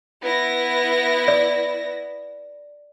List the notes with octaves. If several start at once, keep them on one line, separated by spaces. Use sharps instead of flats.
B3 E4 A#6
D5